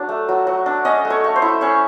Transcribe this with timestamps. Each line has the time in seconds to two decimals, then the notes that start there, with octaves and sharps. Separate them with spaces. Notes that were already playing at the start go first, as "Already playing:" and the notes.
Already playing: F#3 D4
0.09 A3
0.29 F#3
0.47 F#3
0.66 D4
0.85 C#4 D#5
1.05 A3
1.10 C#5
1.24 A3
1.36 C5
1.42 E4
1.61 C#4 C#5